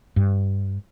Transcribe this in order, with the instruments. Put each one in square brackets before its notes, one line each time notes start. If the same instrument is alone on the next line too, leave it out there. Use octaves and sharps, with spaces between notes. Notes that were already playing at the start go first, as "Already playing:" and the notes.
[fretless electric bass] G2